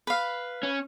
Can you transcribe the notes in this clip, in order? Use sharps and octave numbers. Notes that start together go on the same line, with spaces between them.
B4 F5
C#4